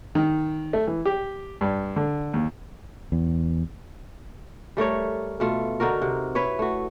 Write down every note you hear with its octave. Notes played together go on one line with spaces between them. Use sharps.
D#3
A3
E3
G4
G2
D3
D#2
E2
G3 A3 A#4 C#5
B2 A3 F4
D3 D#4 F#4 A#4
C3
E4 B4 C#5
A3 F#4